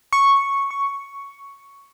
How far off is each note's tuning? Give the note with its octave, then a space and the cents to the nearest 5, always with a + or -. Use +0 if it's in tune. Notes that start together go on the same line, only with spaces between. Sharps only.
C#6 -5
C#6 +5